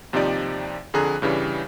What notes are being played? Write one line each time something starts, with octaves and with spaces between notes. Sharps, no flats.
D#2 C3 F3 D#4 G4 D5
F2 D3 G#4 A#5 F#6
G2 C#3 E3 G3